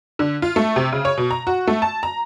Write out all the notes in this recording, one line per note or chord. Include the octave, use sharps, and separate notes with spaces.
D3
F4
A3
C3
C#3
C#5
B2
A#5
F#4
A3
A5
A#5